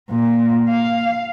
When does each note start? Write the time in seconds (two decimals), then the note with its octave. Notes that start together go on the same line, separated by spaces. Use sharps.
0.11 A#2
0.69 F5